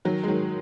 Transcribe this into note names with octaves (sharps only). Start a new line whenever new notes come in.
D#3 F#3
G#3
D#3 F#3